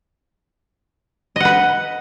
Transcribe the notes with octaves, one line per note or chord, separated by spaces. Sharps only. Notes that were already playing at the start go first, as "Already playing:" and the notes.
B4 D#5 F#5